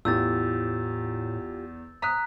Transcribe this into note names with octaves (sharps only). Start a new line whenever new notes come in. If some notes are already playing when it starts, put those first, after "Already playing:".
E2 A2 F4 G4 E6 G6 A6
A#5 D#6 F#6 B6